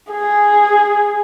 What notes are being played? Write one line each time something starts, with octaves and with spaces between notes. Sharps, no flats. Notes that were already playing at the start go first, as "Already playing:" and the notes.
G#4